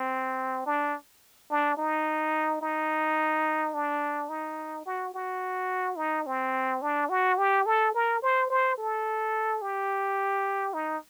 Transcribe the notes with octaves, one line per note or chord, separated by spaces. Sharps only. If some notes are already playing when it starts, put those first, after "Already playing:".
Already playing: C4
D4
D4
D#4
D#4
D4
D#4
F#4
F#4
D#4
C4
D4
F#4
G4
A4
A#4
C5
C5
A4
G4
D#4